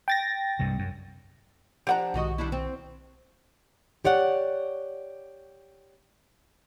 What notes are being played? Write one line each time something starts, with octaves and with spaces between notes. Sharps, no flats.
G5 A6 A#6
C2 G2 C3
F#2
F3 D4 G4 F#5 A#5
B1 G#2 D#3 F#4 D#5 C#6
G3 D4 E4
C4
G4 C#5 D5 F#5